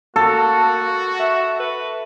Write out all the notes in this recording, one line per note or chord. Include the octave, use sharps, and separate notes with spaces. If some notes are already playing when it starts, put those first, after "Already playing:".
A#3 F#4 A4
E5
B4